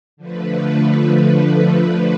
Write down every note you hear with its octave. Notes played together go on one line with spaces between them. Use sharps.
D3 F3 A3 B4